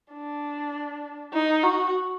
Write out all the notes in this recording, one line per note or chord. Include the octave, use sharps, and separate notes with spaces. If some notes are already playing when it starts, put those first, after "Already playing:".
D4
D#4
F#4